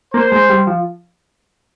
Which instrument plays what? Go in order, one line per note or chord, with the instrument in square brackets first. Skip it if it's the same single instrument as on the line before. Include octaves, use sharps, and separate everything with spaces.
[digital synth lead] A#3 [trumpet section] C5
[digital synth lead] G#3
G3
F3